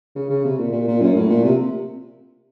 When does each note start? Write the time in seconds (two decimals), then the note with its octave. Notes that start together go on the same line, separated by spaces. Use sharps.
0.16 C#3
0.30 C#3
0.44 C3
0.59 A#2
0.72 A#2
0.87 A#2
1.01 F#2
1.15 A2
1.29 A#2
1.44 C3